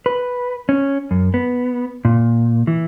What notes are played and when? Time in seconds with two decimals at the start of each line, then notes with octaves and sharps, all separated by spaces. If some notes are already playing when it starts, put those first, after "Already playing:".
0.06 B4
0.69 C#4
1.11 F#2
1.34 B3
2.05 A#2
2.67 E3